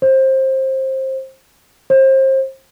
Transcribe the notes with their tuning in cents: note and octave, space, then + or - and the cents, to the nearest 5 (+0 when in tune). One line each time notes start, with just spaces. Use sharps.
C5 +20
C5 +30